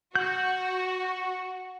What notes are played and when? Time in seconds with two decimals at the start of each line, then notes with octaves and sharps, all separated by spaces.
0.15 F#4 F#5 G6